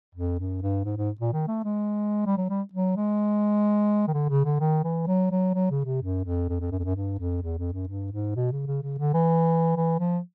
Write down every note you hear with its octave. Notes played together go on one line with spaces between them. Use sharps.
F2
F#2
G2
G#2
G#2
A#2
D#3
A3
G#3
G3
F#3
G3
F#3
G#3
D#3
D3
C#3
D3
D#3
E3
F#3
F#3
F#3
C#3
C3
F#2
F2
F2
F2
F#2
F2
F#2
G2
F2
E2
F2
F#2
G2
G#2
B2
C#3
C#3
C#3
D3
E3
E3
F3